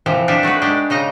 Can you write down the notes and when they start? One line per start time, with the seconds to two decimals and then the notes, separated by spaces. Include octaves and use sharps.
0.06 C3 E3 F3
0.28 C3 D4 D#4 E5 F5
0.43 A3 F#4 G#4 B4
0.62 G#3 D4 G4
0.90 C#3 D#4 D#5 A#5